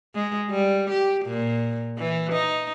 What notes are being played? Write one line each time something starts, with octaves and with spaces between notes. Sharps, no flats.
G#3
G3
G4
A#2
E3
D#4